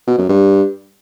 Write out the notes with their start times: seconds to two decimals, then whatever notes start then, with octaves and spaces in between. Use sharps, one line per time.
0.07 B2
0.18 F#2
0.29 G2